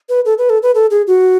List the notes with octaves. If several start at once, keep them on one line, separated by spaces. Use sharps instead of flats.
B4
A4
B4
A4
B4
A4
G#4
F#4